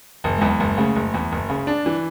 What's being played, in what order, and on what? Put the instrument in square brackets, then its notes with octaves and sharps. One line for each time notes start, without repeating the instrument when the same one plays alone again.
[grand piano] F#1 [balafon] E3
[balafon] G#3
[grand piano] E2 [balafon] F#3
[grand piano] F#1 [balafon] G#3
[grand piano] C#3 [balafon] A3
[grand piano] F#1
E2
F#1
C#3
D4
E3